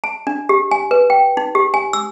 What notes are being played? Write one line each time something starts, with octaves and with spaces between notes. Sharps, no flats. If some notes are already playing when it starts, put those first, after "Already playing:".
A5
D4
G4
G#5
B4
G5
D#4
G4
G#5
E6